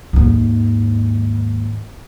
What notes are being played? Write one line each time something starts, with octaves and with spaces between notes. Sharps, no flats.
D#2 G#2